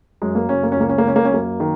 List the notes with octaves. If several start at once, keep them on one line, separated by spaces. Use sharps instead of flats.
F#2 G#3
A#3
F#1 C#4
A#3
C#4
C#2 A#3
C#4
A#3
C#2 C#4
A#3
C#4
F#2 A#3
D#3